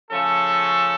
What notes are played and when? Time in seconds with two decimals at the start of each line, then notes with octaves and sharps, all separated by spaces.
0.11 C#3 F3 A3 C#4 A4